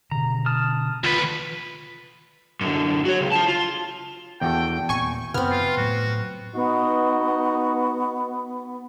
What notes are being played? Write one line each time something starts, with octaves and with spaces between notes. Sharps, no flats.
B2 D3 A#5
A5 D#6 F6
D2 F4 B4
F#2 D3
F#4 C#5
C#2
F4 A5
F4
E2 F#4 A4 G5
D#1 A#2 C4 G#5 C#6
F#2 C#3 B3 C4 F6
F4
A2 F#3 F#4
B3 D#4 F#4